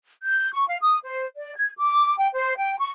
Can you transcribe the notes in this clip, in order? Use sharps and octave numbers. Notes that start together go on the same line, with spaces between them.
G6
C#6
F5
D#6
C5
D5
G#6
D6
G5
C5
G5
C#6